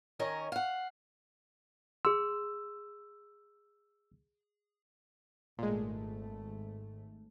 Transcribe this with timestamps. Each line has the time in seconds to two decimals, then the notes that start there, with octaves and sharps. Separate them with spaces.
0.19 D#3 C#4 A#4 C#5 D#5
0.52 F5 F#5
2.05 G#4 C6 E6
5.59 G#1 A#2 G#3 A3